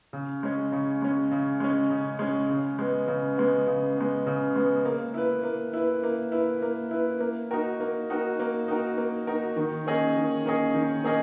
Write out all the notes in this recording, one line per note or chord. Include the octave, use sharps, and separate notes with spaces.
C#3
G#3 C#4
C#3
G#3 C#4
C#3
G#3 C#4
C#3
G#3 C#4
C#3
G#3 B3
C#3
G#3 B3
C#3
G#3 B3
C#3
G#3 B3
A#3
E4 B4
A#3
E4 B4
A#3
E4 B4
A#3
E4 B4
A#3
D#4 F#4 A#4
A#3
D#4 F#4 A#4
A#3
D#4 F#4 A#4
A#3
D#4 F#4 A#4
D#3
A#3 C#4 G#4 D#5
D#3
A#3 C#4 G#4 D#5
D#3
A#3 C#4 G#4 D#5